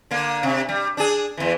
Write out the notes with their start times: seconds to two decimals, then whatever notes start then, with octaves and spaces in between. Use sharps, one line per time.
0.11 D3 A#3
0.43 C3
0.69 G3
0.97 D4 G#4
1.37 E2 E3